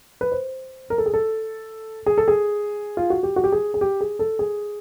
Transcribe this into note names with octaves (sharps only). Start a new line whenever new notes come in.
B4
C5
A#4
A4
G#4
A4
G#4
A4
G#4
F4
F#4
G4
F#4
G4
G#4
G#4
G4
G#4
A4
G#4